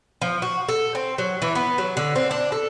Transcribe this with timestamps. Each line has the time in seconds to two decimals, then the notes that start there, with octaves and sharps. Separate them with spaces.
0.22 F3
0.42 F#4
0.69 A4
0.95 C4
1.18 F#3
1.42 E3
1.55 B3
1.78 F#3
1.97 D3
2.16 C4
2.31 D4
2.52 A4